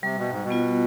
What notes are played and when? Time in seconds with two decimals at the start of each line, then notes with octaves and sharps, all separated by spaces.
0.03 C3 G3
0.17 B2
0.30 G#2
0.44 B2
0.50 B3 F4